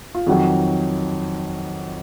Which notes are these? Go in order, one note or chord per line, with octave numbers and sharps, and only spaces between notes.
F4
F2 D#3 F#3 F#4